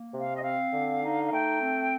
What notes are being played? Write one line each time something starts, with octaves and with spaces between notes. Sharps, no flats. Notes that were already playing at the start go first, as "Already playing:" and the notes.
Already playing: A#3
C3
F5
D#5
C4 F5
D3
D#4
F5
A3 G5
C4